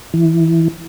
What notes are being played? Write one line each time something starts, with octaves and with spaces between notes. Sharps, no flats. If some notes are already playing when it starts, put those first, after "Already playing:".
E3